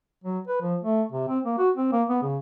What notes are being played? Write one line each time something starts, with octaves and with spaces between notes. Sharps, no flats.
F#3
B4
F3
A3
C3
C4
A#3
F#4
C4
A#3
B3
C#3